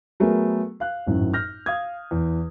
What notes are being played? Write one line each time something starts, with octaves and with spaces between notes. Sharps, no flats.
F#3 A3 B3 G#4 A#4
F5 F#6
G#1 F#2 A2
F6 G6 A#6
F5 D#6 G#6
E2